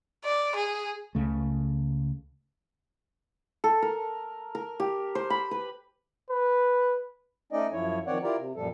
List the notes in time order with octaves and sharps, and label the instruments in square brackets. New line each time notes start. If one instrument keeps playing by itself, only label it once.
[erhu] D5
G#4
[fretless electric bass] C#2 C#3 A3
[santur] A4
A#4
A#4
G4
C5
B5
B4
[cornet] B4
[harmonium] A3 C#4 D#4 D5 D#5
F#2 F3 E4 C#5
D#3 F3 C4 C#5 D5 F#5
E4 F4 G4 A#4 D5 A#5
C3
F#2 A#2 F3 G3 A4